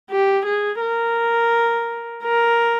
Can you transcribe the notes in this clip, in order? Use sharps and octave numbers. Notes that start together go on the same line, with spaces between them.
G4
G#4
A#4
A#4